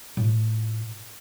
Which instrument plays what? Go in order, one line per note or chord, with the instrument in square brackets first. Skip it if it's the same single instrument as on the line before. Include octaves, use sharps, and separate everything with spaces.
[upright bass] A2 F4